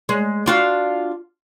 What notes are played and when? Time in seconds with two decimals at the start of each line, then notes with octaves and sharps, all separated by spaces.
0.09 G#3
0.46 D4 F4 F#4